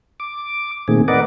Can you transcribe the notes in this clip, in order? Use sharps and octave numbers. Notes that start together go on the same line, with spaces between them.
D6
A#2 D#3 A3 C4 G#4
A#4 B4 D5 D#5 F#5 D6